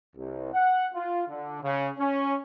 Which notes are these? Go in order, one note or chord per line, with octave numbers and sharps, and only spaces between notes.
C2
F#5
F4
D3
C#3
C#4